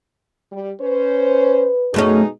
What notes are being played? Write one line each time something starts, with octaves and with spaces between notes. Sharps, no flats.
G3
C#4 B4 C5
F#2 B2 A3 C#4 D#4 G#4